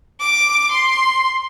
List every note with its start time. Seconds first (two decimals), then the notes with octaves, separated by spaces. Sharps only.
0.20 D6
0.72 C6